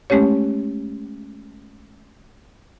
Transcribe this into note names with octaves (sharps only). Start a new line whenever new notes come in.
G#3 A3 C#4 G4 C#5